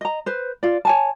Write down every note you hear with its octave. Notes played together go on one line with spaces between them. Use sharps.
D#5 A#5
B4 C5
F4 D5
C#5 G#5 A5